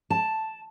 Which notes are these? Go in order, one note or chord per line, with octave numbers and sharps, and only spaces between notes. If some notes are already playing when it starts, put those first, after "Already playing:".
A5